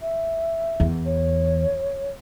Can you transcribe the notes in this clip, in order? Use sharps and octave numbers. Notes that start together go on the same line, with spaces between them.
E5
E2
C#5